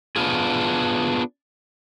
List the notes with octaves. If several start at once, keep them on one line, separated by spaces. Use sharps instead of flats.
B3 D4 F4 G#4